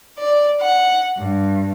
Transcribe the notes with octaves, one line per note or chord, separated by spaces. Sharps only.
D5
F#5
G2